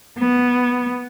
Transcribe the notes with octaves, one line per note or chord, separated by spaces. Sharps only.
B3